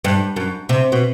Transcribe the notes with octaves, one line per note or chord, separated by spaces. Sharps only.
G2
F#2
C3
B2